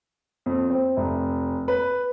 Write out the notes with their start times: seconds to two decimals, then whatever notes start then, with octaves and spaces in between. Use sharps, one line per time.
0.46 F2
0.70 C4
0.97 F1
1.68 B4